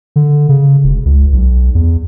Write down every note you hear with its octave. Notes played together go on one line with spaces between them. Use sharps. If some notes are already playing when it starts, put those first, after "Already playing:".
D3
C#3
E1
C#2
B1
E2